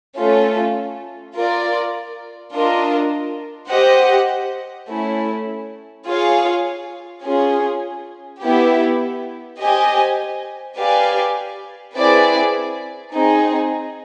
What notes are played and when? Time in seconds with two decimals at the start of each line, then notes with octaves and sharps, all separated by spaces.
0.17 A3 C#4 F4 A4
1.35 F4 A#4 D5
2.53 D4 F4 A#4 D#5
3.70 G4 C5 D#5 F#5
4.89 A3 C#4 E4
6.06 F4 G#4 C#5 F5
7.25 C#4 F4 G#4
8.43 B3 E4 G4
9.60 G4 C5 D#5 G#5
10.78 G4 B4 D5 F5 G#5
11.96 C4 E4 G#4 B4 D5
13.13 C4 D#4 G#4